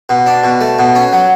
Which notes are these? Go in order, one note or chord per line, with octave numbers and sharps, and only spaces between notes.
B2
D4
B2
A3
B2
C#4
F#3